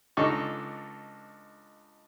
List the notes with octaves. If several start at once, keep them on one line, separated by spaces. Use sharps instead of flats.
C#2 D4 D#4 A4 C#6